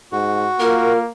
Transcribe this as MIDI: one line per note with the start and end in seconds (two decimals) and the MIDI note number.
0.12 0.46 44
0.12 0.93 66
0.60 1.11 58
0.60 1.01 65
0.60 0.98 70